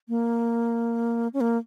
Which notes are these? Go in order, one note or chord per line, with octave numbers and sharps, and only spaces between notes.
A#3
C#4
A#3